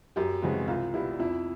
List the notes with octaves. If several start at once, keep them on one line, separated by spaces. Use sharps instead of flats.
F#2 G4
C#3 E3 G#3 C4 F#4
C2 F4
B2 G3 B3 E4
F2 E4